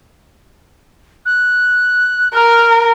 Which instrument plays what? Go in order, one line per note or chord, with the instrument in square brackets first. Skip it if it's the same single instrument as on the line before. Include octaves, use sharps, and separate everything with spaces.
[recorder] F#6
[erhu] A#4 [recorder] F6